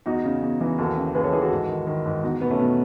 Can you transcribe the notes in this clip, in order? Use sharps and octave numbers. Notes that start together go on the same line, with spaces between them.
E2 D#4 F#4
C#3
E2
E3
D#2 F#4 A4
C#3
D#2 G#4 B4
A4 C#5
E3 G#4 B4
F#4 A4
G#2
D#3
D#3
G#2
E2 D#4 F#4
B2 B3
A3 C#4
B2 B3